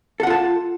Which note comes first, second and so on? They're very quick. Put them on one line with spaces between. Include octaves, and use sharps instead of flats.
A4 F#5 F4 A5